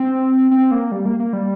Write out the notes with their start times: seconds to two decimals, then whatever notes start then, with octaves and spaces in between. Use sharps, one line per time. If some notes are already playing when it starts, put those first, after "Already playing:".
Already playing: C4
0.51 C4
0.71 A#3
0.92 G3
1.05 A#3
1.20 A#3
1.33 G3